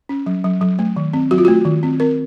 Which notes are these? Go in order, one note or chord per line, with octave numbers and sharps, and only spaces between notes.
C#4
F#3
F#3
F#3
A3
D#3
C4
F#3 F#4
F4
A3 F#4
D#3
C4
C4 A#4